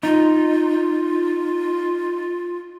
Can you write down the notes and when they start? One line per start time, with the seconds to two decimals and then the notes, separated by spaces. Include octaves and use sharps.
0.03 D#4 F4